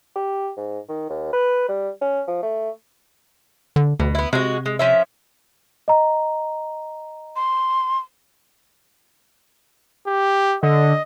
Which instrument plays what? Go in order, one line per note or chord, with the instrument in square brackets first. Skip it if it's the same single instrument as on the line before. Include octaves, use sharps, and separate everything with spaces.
[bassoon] G4
G#2
D#3
D#2
B4
G3
C#4
F3
A3
[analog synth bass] D3
[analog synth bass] D2 [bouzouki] B2
[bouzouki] B3 E4
[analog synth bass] C3 [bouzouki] G#3 F#4
[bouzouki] G#3
F3 C#4 E5
[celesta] D#5 A#5
[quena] C6
[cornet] G4
[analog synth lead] D3 [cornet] D#5